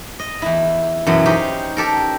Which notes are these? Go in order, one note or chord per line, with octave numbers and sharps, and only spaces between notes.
D#5
E2 E4
F#2 B2 E3 F#3
C#4 D#4 G4 C5
G4 A4 A#4